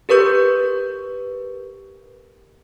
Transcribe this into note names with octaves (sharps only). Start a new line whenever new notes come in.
G4 A#4 B4 C#6 G6